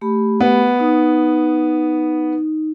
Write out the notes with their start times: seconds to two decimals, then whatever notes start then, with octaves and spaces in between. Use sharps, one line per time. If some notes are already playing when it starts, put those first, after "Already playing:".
0.01 A3 G4 B5
0.40 B3
0.80 D#4